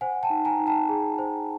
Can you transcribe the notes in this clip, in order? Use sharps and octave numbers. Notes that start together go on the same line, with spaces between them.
C5 F#5 G#5
G5 A5
D#4
G#5 A#5
D#4
G5 A5
G#4
C5